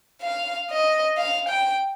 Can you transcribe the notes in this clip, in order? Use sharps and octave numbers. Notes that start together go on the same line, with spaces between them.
F5
D#5
F5
G5